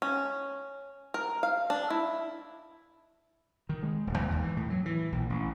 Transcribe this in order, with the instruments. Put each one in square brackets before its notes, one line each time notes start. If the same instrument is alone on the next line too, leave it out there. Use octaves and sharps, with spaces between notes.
[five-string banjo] C#4
A#4
F5
D4
E4
[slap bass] D#3
G#3
D#1
D#2
D#2
E3
A2
F#3
E3
A#1
A1